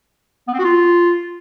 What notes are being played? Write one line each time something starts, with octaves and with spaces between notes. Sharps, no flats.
B3
C4
F#4
F4